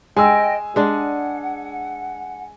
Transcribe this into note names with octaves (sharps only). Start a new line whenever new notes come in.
G#3 D#5 G5 G#5 E6
G#3 D4 F#5